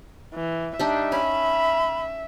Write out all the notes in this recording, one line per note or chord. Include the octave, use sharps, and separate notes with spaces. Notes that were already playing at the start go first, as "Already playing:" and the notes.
E3
G3 D4 D#4 E5
C#4 B5